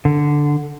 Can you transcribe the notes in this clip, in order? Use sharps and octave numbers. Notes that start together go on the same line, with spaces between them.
D3